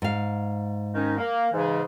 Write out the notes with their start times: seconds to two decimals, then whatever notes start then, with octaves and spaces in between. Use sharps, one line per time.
0.02 G#2 F5
0.93 D#3 C#4 D#4
1.16 A#3
1.52 G#2 C#3 E3